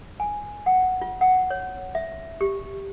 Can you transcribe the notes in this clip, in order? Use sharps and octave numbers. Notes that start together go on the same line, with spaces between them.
G#5
F#5
F4
F#5
C#5
E5
G4